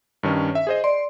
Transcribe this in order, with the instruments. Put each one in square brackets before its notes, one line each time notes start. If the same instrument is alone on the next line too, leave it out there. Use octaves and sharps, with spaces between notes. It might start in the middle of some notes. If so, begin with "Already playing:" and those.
[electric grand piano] G2 D#3 C#4
E5
G#4 C5 D#5
[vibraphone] D5 [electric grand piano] C6